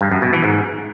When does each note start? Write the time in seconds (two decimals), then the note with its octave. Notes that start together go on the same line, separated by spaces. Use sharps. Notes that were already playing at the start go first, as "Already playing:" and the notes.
0.01 G2
0.11 F#2
0.22 B2
0.33 E3
0.44 G#2